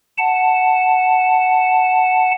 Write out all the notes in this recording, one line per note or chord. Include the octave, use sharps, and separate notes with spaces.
F#5 A5